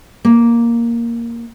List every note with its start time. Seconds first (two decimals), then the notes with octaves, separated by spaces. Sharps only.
0.25 A#3